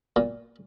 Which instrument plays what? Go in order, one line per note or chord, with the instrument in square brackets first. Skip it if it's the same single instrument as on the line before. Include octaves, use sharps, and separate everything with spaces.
[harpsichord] A#2